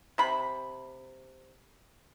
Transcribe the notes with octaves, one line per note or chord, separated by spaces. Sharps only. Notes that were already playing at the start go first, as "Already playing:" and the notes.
C3 B5